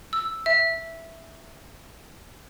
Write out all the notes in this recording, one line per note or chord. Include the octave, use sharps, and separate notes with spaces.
E6
E5